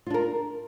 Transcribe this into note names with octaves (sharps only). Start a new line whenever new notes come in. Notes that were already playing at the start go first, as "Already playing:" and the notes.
D4 F4 A#4